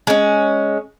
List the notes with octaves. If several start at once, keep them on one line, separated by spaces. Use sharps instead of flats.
G#3 C#4